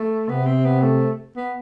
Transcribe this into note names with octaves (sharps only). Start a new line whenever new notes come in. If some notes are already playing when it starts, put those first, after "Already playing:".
Already playing: A3
C3 B3
C4
B3
A3
B3